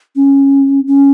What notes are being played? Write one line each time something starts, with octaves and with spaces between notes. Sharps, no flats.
C#4
C#4